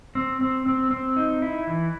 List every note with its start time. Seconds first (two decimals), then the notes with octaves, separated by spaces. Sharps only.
0.15 C4
0.41 C4
0.66 C4
0.91 C4
1.16 D#4
1.42 E4
1.67 E3